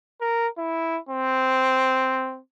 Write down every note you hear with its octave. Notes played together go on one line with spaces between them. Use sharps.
A#4
E4
C4